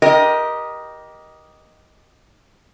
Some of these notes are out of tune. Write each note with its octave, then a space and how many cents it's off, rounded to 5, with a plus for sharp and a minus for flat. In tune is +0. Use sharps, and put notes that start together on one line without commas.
G4 -10 A#4 +25 D#5 +0